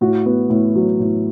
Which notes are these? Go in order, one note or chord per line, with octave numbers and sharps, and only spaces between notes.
A2 F#4
B3
A2
F#3
A2